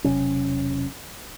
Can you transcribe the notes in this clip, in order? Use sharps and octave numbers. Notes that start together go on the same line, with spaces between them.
E1 C3 F#3 C#4